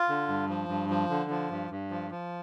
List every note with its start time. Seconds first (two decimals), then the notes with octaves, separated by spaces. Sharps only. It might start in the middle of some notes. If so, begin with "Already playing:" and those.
Already playing: F4
0.09 D3
0.28 G2
0.49 F3
0.69 G2
0.90 F3
1.10 D3
1.30 F3
1.50 G2
1.71 G2
1.91 F3
2.11 F3